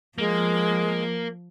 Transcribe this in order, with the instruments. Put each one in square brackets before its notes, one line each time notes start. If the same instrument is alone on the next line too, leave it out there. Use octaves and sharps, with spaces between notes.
[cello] F3 [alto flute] G#3 [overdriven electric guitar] A#3